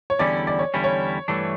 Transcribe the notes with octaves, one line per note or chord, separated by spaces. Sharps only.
C#5
E2 D3 G3 C#4 E4 D5
D5
C#5
E2 D3 G3 C#4 E4
C#5
G2 E3 A3 D4